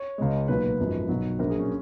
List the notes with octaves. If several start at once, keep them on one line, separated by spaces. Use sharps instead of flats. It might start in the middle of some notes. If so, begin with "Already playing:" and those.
Already playing: C#5
C#2 C#3 G#3
B1 A#2 F#3 B4
B4
G#1 F#2 F3 G#3
B1 B2 F#3
A#1 A#2 F#3 A#4
G#4
C#4